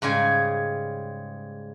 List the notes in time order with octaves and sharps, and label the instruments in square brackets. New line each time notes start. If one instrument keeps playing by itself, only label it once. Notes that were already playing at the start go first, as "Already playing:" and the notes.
[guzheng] G#2 C#3 G3 G#5